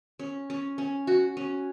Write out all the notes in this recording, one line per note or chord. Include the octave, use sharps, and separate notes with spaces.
C#4
C#4
C#4
F#4
C#4